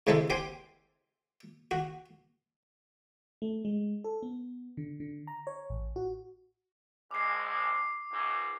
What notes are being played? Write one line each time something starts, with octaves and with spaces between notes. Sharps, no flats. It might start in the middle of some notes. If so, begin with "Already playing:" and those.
G#2 C3 G#3 E4 A4
G4 C5 G5 G#5
F#4
A3
G#3
A4
B3
D3
D3
A#5
C#5
A1
F#4
A#1 G#3 D6 C7
C#2 G#2